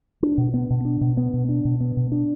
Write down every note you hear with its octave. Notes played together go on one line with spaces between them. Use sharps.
D4
B2
B3
B2
D4
B2
B3
B2
D4
B2
B3
B2
D4